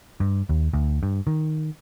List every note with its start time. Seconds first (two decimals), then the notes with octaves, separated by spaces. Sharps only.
0.20 G2
0.49 D#2
0.73 D2
1.03 G2
1.27 D#3